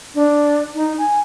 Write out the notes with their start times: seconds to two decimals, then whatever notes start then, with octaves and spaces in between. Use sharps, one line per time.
0.15 D4
0.75 D#4
0.98 G#5